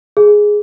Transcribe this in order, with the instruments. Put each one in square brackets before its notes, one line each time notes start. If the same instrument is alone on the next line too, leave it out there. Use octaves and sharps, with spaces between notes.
[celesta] G#4